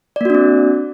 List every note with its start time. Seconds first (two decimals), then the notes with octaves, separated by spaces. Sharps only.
0.16 D5
0.21 A#3
0.25 F#4
0.30 D4
0.35 C4